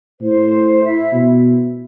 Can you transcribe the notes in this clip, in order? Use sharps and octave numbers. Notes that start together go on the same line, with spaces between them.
A2 C5
E4 E5
B2